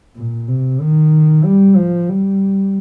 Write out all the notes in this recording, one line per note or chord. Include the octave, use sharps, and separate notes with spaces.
A#2
C3
D#3
G3
F3
G3